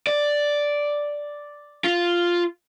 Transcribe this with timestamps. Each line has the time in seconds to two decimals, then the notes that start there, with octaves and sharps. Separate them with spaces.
0.07 D5
1.84 F4